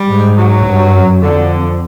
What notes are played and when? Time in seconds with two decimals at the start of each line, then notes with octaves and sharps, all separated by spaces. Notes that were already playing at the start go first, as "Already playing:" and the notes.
Already playing: G3
0.09 G#2
0.37 F#3
0.66 G2
0.94 F#2
1.22 F2 D3